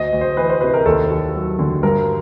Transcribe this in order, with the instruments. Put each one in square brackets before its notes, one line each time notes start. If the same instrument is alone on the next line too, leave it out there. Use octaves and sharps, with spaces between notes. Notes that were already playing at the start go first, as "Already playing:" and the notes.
Already playing: [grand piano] D2 D#5
D2
C5
E3 B4
C5
C3 B4
A#4
D#2 A4
D#2
F#3
D3
G2 A#4